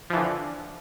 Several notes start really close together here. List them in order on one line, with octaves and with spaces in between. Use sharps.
F3 E3 D3